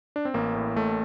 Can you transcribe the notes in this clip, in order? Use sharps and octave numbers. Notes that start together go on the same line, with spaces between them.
D4
C4
A1 A#3
A2
A1 A3